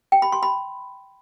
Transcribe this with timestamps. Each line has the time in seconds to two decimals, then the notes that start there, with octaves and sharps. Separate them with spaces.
0.12 G5
0.22 B5
0.32 C6
0.43 B5